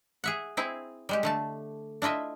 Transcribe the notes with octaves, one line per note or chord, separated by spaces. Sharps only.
G#4 E5 F#5
C4 E4 G#4
G3 G#3 G4
D3 A3 A5
D4 E4 F4 D#5 E5